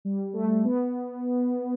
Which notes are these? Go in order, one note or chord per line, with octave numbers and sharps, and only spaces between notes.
G3
A3
B3